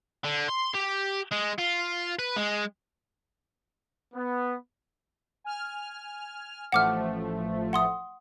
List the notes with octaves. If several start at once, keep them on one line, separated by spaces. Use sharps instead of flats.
D3
C6
G4
G#3
F4
B4
G#3
B3
G#5 F6
A1 F3 A3 F#5 D6 F6
F#5 C6 D#6